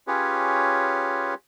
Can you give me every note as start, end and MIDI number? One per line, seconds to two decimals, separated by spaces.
0.07 1.34 61
0.07 1.34 65
0.07 1.34 67
0.07 1.34 68
0.07 1.34 71
0.07 1.34 73